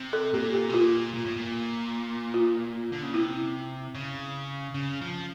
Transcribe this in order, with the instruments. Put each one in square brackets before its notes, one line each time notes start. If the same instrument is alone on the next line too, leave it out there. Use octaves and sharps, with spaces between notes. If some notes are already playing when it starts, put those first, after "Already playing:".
Already playing: [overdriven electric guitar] C3
[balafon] A4
[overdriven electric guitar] A#2 [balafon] G4
[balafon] G4
[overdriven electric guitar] B2
[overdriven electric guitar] A#2 [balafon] F4
[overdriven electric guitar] A#2
A2
A#2
[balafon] F4
[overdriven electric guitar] D3
C#3
[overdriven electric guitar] C3 [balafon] E4
[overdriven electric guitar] C#3
C#3
F3